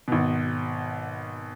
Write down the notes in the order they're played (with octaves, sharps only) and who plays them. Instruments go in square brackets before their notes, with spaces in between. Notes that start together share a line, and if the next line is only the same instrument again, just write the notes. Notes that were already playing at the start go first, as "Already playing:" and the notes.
[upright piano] G#1 B2